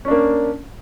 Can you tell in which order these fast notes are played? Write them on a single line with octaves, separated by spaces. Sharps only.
C#4 D4 A#3